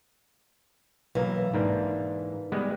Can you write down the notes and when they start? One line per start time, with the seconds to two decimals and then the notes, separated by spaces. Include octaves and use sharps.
1.15 B1 E3 A#3
1.54 G#2 A#3 D4
2.52 G3 G#3 B3